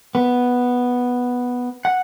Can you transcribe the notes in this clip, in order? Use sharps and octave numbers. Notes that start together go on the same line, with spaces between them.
B3
F#5